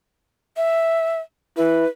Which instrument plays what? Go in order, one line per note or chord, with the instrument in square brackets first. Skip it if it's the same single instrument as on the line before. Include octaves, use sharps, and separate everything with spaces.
[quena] E5
[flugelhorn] E4 [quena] B4